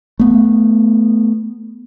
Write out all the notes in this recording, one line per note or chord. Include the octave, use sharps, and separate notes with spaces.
A3 B3